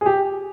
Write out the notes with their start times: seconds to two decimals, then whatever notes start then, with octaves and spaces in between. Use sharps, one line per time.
0.01 G#4
0.06 G4